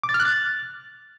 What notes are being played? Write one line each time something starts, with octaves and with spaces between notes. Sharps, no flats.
D6
A6
F6
F#6
A6